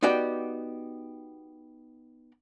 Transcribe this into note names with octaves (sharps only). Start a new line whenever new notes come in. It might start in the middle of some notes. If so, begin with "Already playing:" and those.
B3 D#4 F#4 G4 D5 G5